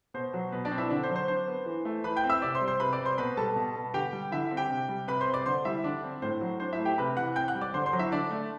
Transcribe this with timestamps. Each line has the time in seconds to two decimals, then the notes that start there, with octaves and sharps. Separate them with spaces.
0.14 B2 C5
0.34 F#3
0.52 B2 B4
0.65 D4 D5
0.72 C4
0.78 E4 E5
0.90 D3 D4 D5
1.03 C5
1.10 F#3
1.16 C5
1.28 D4 C5
1.48 B3
1.66 E3
1.85 A3
2.04 E3 B4 B5
2.16 G5 G6
2.24 C4
2.30 E5 E6
2.42 C3 D5 D6
2.55 C5 C6
2.62 G3
2.68 C5 C6
2.80 C3 B4 B5
2.93 D5 D6
2.99 C4
3.05 C5 C6
3.18 B2 B4 B5
3.37 G3 A4 A5
3.56 B2
3.75 B3
3.94 D3 G4 G5
4.13 G3
4.32 D3 E4 E5
4.51 C4
4.57 G4 G5
4.70 C3
4.89 G3
5.08 C3 B4 B5
5.21 C5 C6
5.27 C4
5.34 D5 D6
5.46 D3 C5 C6
5.65 G3 E4 E5
5.84 D3 D4 D5
6.03 C4
6.22 A2 C5
6.41 F#3
6.60 D4 C5
6.73 E4 E5
6.79 A3
6.85 G4 G5
6.98 C3 B4 B5
7.16 E3 F#5 F#6
7.36 C4 G5 G6
7.48 F#5 F#6
7.55 G3
7.61 D5 D6
7.74 D3 C5 C6
7.86 C5 C6
7.93 F#3
7.99 E4 E5
8.12 D3 D4 D5
8.31 A3